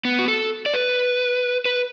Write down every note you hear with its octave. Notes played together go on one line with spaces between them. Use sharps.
B3
F#4
A4
D5
B4
B4